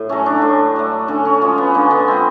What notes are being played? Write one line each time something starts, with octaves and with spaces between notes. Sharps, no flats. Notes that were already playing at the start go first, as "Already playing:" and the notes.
Already playing: A2
F#3 A3 C#4
D4
A2
F#3 A3
D3 C#4
C#4
F3 G#3 C#4
B3
D3 A#3
B3
F3 G#3 C4